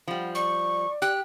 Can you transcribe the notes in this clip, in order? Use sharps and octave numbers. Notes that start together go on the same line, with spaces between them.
F3 G3 F#5 B5
D5 C#6
G4 F#6